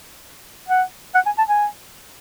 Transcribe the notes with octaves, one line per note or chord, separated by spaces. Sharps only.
F#5
F#5
G#5
A5
G#5